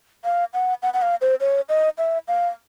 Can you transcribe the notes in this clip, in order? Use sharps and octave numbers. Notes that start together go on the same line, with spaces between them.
F5
F#5
F#5
F#5
F5
C5
C#5
D#5
E5
F5